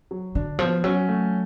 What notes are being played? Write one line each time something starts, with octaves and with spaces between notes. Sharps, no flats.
F#3
D3 D4
F3 B3
F#3 C#4
A3